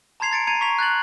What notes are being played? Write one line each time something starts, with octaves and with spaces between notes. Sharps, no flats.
A5 A#5 C6 G#6 C7 F7
G#6 A6 C#7 D7
A#5 G#6 C#7 D#7 F7
C#6 B6 F7
F#6 G#6 A6 F#7